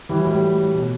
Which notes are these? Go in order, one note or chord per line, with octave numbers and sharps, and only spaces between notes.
E3 G3
F#3
A2
G3
A2
A2
B2